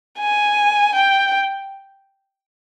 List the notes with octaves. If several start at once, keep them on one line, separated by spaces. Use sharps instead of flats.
G#5
G5